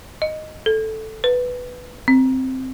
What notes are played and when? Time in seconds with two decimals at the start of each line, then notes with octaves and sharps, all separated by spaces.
0.22 D#5
0.66 A4
1.24 B4
2.08 C4